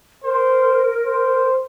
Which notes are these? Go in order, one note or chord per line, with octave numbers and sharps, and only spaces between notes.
A#4 C5
C5